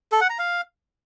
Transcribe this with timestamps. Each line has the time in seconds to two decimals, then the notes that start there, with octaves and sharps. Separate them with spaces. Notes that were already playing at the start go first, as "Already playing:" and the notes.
0.12 A4
0.21 F#5
0.30 A#5
0.39 F5